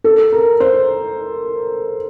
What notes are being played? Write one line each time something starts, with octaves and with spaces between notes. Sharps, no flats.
A4
A#4
C5